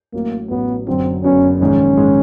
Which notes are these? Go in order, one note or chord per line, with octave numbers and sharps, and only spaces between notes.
A1 A2 F#3 A#3
A1 A2 F#3 B3
F#1 F#2 D3 F#3 B3 C4
F#1 F#2 D3 F#3 B3 C#4
A#1 G#2 D#3 G#3 C#4
G#2 D#3 G#3